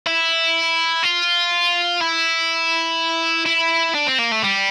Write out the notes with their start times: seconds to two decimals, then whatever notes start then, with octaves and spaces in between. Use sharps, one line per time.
0.07 E4
1.04 F4
2.01 E4
3.46 E4
3.94 D4
4.07 C4
4.18 A#3
4.31 A3
4.43 G3